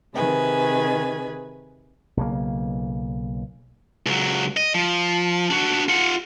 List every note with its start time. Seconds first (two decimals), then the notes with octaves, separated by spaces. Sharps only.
0.14 C3 D#3 G#4 B4 G#5
2.17 B1 C#3 A#3
4.06 C#2 F#3
4.57 D#5
4.74 F3
5.51 D4 F#4
5.89 F4 F#5